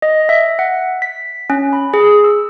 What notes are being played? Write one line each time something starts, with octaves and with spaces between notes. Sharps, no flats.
D#5
E5
F#5
B6
C#4
B5
G#4
E6